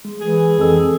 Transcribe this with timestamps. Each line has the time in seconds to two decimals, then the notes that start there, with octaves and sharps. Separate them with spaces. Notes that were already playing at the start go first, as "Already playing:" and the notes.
0.05 G#3
0.21 E3 G#4
0.59 F2 E3 A4 E6